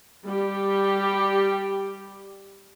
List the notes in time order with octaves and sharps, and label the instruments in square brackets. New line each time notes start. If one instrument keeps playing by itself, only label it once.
[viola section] G3 G4